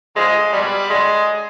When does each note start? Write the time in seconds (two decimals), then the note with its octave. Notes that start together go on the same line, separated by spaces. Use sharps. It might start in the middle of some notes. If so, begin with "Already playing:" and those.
0.15 G2 D3 F3 G#3
0.52 B2 F#3 G3
0.89 G2 D3 F#3 G#3